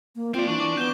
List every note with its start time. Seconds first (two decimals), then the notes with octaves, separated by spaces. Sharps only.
0.15 A#3
0.34 C4 F4 D5
0.48 E3 D4 C#6
0.60 C#6 D6
0.77 B3 G6 E7 G7